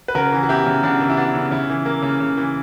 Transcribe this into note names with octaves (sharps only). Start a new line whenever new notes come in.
B4
C#3 F#4 A#4
E3
F#4
B3 E4 G4
C#3
C#3 D4 F#4
E3
E4
B3 D4
C#3
C#3 E4
E3
A#3
C#3
C#3
E3